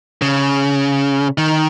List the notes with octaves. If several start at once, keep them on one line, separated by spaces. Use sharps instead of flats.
C#3
D#3